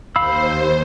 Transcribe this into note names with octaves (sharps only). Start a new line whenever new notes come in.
D#2 C5 F5 B5 E6